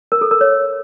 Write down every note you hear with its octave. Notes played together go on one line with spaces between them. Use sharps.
A#4
A4
A#4
C#5